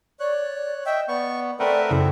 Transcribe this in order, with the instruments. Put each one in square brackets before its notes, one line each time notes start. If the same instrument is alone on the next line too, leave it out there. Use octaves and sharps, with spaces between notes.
[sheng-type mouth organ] C#5 F#6 [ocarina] D5
[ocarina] D#5 [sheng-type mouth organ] E5 G5
[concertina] B3 [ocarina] D5 [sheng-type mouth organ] C#6
[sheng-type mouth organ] A3 C4 E5 [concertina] A#4 B4 F#5 [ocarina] D5 [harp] G5
[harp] F#2 C#3 [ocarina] E4